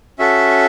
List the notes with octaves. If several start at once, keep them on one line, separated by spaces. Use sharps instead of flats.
C#4 F#4 A4 E5